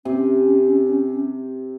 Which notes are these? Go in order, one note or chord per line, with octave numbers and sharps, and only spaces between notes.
C3 C#4